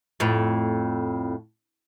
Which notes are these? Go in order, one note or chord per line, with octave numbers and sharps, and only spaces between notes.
F2 A2